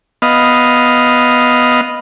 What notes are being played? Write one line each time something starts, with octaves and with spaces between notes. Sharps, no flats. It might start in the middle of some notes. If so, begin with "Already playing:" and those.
B3 D#5 F5